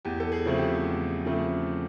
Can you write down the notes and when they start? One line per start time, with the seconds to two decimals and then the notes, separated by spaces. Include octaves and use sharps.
0.05 E2 G4
0.20 A4
0.32 G#4
0.45 C#3 F3 A3 C4
0.58 G4
0.85 E2
1.25 C#3 F3 A3 C4